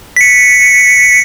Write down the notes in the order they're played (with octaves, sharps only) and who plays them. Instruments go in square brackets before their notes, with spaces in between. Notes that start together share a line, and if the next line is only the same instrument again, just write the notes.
[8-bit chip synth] B6 C#7